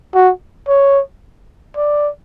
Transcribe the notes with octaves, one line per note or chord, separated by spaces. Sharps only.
F#4
C#5
D5